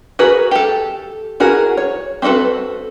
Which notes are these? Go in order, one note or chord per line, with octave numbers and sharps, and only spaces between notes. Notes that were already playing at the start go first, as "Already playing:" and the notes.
F#4 G#4 A#4 B4
G4 A4
E4 F#4 G#4 A#4
C#5
C4 D4 F#4 A4 B4